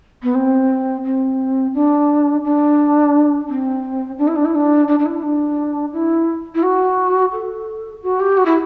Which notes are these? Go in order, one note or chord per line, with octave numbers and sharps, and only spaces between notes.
B3
C4
C4
D4
D4
C4
D4
E4
D4
E4
D4
D4
D4
E4
D4
E4
E4
F#4
A4
F#4
G4
F#4
E4